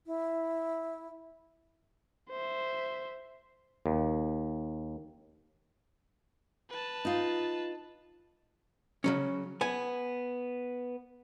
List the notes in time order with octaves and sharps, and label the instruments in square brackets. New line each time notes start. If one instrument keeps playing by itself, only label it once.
[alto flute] E4
[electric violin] C5 E5
[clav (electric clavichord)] D#2
[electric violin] B4 A5
[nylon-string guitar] D#4 F4
[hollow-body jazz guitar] C#3 F#3 C#4
B3 G#5